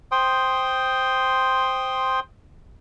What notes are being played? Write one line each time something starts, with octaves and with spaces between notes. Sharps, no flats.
C5 G5 C6 D#6